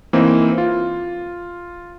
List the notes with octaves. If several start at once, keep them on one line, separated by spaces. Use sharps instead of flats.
E3 A#3 C4 D#4
F4